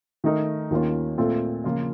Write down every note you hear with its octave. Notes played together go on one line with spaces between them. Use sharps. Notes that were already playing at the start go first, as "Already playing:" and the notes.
D#3 A3 D#4 A#4
D#2 D#3 A#3 C#4 F4
A#2 A3 C4 F4 A4
C#3 F3 A#3 F4